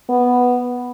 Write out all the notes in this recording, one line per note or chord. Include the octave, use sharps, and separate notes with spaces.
B3